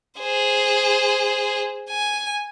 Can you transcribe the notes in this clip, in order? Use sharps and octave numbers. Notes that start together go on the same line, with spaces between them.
G#4 C5
G#5